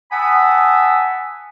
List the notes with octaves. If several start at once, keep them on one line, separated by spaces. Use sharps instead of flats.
F#5 G#5 A5 B5 D#6 E6